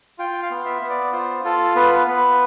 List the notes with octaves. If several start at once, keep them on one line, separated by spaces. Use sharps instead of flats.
F4 G5
F5
B3
E5
B3
D5
F4 C5
F4 A4
B3 B4
B3 B4